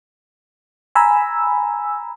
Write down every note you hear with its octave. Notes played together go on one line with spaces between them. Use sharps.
G#5 A#5 B5 E6